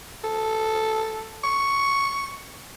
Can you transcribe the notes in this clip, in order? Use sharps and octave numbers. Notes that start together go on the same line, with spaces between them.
A4
C#6